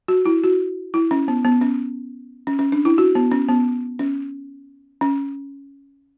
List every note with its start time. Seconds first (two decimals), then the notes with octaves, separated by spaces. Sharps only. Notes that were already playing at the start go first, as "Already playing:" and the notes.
0.08 F#4
0.26 E4
0.44 F#4
0.94 E4
1.11 C#4
1.28 B3
1.45 B3
1.61 C#4
2.47 C#4
2.59 C#4
2.72 D4
2.85 E4
2.98 F#4
3.15 B3
3.32 C#4
3.49 B3
3.99 C#4
5.01 C#4